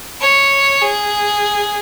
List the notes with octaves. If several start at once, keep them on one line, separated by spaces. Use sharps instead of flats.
C#5
G#4